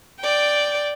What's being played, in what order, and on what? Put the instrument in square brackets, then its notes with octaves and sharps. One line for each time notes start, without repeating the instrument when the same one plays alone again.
[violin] D5 G5